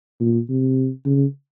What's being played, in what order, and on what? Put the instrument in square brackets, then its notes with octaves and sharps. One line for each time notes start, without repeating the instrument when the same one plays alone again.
[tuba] A#2
C3
C#3